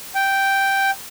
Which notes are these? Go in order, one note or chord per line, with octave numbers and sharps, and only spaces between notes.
G5